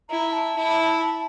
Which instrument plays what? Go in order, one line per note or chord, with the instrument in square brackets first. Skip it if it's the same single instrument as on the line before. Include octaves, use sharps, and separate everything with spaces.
[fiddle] E4 [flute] A#5
[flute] A5
[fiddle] E4